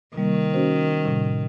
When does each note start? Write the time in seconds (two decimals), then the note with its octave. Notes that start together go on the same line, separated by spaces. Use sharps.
0.16 C3 D#3 G3 A#3
0.54 C#4 F#4 C5
1.04 A2 C3 G3